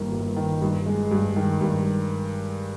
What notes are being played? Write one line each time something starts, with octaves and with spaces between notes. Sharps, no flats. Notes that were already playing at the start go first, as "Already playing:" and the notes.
Already playing: G1 G2 D#3 A#3
G1
D#3
G2
G#3
G2
D#3
G2